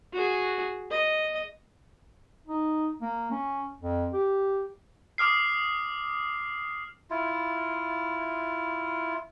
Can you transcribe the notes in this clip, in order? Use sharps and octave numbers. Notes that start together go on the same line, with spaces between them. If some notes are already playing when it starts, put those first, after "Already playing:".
F#4 G#4
D#5
D#4
A#3
C#4
F2
G4
D6 D#6 F6 C7
E4 F4